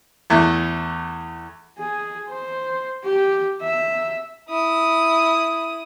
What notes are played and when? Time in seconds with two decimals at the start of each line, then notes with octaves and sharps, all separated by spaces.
0.30 E2 A3
1.78 G#4
2.29 C5
3.04 G4
3.61 E5
4.49 E4 D#6